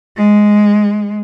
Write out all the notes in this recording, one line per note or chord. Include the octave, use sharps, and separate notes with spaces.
G#3